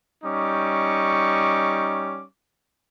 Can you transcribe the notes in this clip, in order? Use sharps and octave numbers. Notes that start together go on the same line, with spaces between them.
G3 C#4 D#4 C#6 D6